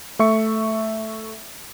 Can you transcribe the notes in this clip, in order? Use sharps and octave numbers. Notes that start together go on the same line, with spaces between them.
A3 E5 C#6 C#7